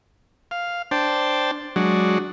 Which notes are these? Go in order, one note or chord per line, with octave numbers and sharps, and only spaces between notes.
F5
D4 C5 G5 A5
F#3 G#3 D4 F#4